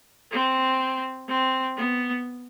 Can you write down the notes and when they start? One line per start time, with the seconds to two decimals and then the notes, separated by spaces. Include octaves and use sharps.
0.32 C4
1.28 C4
1.77 B3